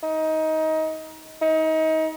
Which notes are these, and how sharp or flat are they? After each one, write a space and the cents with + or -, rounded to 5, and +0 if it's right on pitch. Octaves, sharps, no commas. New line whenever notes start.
D#4 +20
D#4 +30